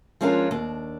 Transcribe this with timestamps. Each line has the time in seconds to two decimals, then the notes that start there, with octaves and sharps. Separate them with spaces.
0.21 F3 G#3 C#4 D4 F4 A#4
0.51 D#2 D4